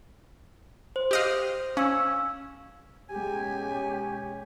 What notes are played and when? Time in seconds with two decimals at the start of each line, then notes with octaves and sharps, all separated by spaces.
0.96 C5
1.11 G4 D#5 F5
1.77 C#4 F5 E6
3.09 B2 G#3 C#4 G4 G#5